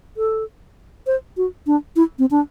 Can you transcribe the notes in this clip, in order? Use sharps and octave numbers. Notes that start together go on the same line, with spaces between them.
A4
C5
F#4
D4
E4
C4
D4